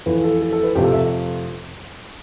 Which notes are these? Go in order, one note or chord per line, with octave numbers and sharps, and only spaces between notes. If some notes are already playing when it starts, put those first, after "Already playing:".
F2 E3 A3 B4
A4
A4
A4
B4
F2 C3 F3 A3 G4
A4
E5